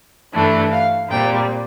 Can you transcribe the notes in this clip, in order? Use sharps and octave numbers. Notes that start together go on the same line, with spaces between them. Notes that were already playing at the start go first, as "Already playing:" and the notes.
G2 E3 A3 D4
F5
A#2 G3 C4 G5